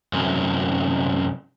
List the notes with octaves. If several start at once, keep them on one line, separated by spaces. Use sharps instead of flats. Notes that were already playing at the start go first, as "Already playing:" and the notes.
C2 F#2